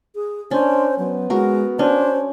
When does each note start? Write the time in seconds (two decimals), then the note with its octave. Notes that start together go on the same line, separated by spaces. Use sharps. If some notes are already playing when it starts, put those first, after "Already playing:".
0.15 G#4
0.51 C#4 D4 C5
0.98 F#3 B3
1.30 G#3 F#4 A#4
1.79 C#4 D4 C5